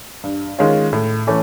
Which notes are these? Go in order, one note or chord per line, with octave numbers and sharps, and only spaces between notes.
G2
D#3 G#3 C#4 F4
A2
E3 A3 C#4